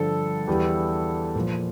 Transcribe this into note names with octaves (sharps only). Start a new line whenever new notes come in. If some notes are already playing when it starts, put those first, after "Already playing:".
Already playing: G2 D3 F3 A4
E2 E3 G3
A#2 F3